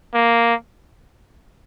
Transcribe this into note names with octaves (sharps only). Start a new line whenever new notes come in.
A#3